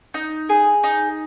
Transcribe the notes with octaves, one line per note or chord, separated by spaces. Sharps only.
D#4
G#4
D#4